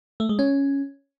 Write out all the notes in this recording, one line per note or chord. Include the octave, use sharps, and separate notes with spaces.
A3
G#3
C#4